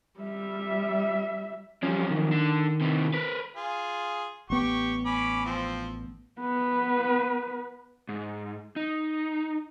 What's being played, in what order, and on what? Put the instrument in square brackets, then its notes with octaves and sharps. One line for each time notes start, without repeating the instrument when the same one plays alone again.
[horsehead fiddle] G3 E5
[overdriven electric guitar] F#2 F3 [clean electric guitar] G3 C#4
[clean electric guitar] D#3
[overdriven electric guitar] D3
C3 E3
A#4 B4
[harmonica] F4 G#4
[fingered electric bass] A1 B3 [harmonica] G4 C#6
[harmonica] C#4 B5 D6
F3 C4
[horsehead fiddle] B3 B4
[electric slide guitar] G#2
D#4